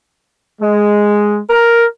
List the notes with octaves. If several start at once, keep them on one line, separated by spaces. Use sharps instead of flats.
G#3
A#4